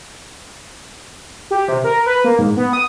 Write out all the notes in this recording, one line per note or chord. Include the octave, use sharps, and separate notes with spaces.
G4
C3
A#4
B4
A#3
G#2
B3
D#6